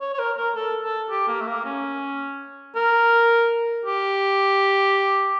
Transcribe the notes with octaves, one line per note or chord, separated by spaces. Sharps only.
C#5
C#5
A#4
A#4
A4
A4
G4
A#3
A3
A#3
C#4
A#4
G4